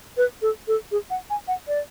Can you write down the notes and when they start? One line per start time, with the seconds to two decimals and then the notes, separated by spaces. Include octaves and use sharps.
0.17 B4
0.42 A4
0.68 A4
0.92 G#4
1.10 F#5
1.30 G#5
1.48 F#5
1.68 D5